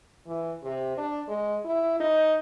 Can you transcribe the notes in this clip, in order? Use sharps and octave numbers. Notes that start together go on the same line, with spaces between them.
E3
C3
D4
G#3
E4
D#4